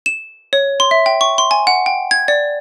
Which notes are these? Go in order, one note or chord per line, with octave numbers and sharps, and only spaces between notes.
E7
C#5
C6
E5
G5
C#6
C6
G#5
F#5
G5
G#6
D5